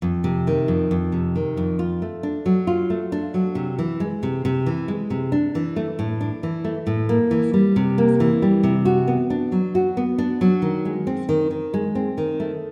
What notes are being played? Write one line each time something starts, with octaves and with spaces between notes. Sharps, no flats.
F2
C3
D#3
F2
F2
C3
D#3
F2
F4
A3
D4
F#3
F4
A3
D4
F#3
C3
E3
G#3
C3
C3
E3
G#3
C3
D4
E3
A3
A2
D4
E3
A3
A2
A#3
E3
G3
C3
A#3
E3
G3
C3
F#4
B3
D4
F#3
F#4
B3
D4
F#3
D#3
G#3
C4
D#3
D#3
G#3
C4
D#3
A3